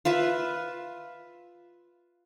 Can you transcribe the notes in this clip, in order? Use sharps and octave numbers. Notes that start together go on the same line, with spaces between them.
F4 B4 E5